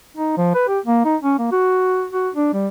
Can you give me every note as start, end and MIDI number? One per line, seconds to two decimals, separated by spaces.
0.17 0.34 63
0.37 0.51 53
0.55 0.64 71
0.68 0.79 67
0.86 1.04 58
1.05 1.16 63
1.23 1.36 61
1.39 1.51 58
1.52 2.08 66
2.13 2.29 66
2.34 2.49 62
2.53 2.68 55